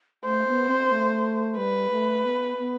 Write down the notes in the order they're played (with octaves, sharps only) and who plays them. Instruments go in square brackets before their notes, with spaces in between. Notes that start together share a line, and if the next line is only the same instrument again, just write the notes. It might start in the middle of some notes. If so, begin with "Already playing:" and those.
[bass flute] A3 [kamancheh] C5
[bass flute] B3
C4
A3
[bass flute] G3 [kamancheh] B4
[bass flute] A3
B3
B3